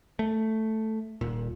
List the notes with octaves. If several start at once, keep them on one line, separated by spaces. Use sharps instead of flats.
A3
D#1 A#2